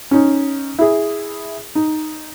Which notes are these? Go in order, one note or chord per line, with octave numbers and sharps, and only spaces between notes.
C#4 D#4
E4 G#4
D#4